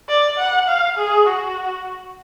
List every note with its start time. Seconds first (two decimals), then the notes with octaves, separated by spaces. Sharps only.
0.09 D5
0.39 F#5
0.68 F5
0.97 G#4
1.27 F#4